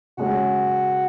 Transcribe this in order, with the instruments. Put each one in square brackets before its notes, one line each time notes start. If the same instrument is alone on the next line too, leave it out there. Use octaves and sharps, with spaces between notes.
[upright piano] C#3 G#3 C#4 [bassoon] F#4